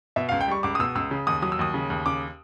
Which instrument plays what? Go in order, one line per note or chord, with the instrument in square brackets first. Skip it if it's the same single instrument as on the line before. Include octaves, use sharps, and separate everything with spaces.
[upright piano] B2 E5
C#2 F5
G5
G3 C#6
C#2 D6
D#6
B2 E6
C#2 E6
C#3
D#2 D#6
F#3 D#6
E6
D#2 D#6
C#3
D#2
C#3 D6